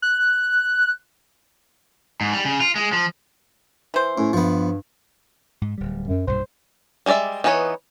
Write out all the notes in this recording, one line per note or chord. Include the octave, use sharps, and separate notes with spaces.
F#6
G#2
G3
C#3
F4
G#3
F3
E3 C5
A2 C#4
G2 F3 B3
G#2
D1 G3
F#2
B1 G2 A#2 C5
G3 G#3 G#4 D5 E5
E3 B3 D#4 B4 C#5